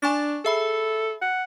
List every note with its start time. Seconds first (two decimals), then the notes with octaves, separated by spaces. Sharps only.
0.02 D4 G#5 C#6 A6
0.45 G#4 A4 E5 B5
1.22 F#5